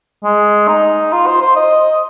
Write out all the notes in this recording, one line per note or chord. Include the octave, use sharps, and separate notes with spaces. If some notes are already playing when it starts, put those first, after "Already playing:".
G#3
D#4
F4
C5
C5
D#5